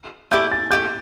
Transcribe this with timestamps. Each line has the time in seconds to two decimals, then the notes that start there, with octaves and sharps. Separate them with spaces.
0.31 A3 E4 G4 D5 G6
0.51 A6
0.71 A3 E4 G4 G6